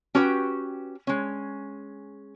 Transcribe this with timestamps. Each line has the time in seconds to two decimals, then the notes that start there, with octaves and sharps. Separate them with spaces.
0.15 C#4 F#4 G4 B4 G5
1.07 G#3 C#4